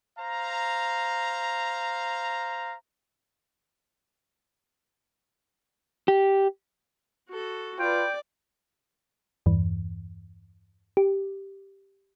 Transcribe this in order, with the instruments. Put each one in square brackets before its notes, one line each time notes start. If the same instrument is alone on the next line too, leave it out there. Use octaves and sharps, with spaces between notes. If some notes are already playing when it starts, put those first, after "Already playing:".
[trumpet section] C5 F5 A#5
[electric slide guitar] G4
[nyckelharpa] F#4 A4
[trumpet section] F4 B4 [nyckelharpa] D5 [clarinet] G5
[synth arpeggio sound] E2 G2 E3
G4